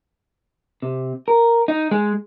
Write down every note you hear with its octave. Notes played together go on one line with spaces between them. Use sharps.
C3
A#4
D#4
G#3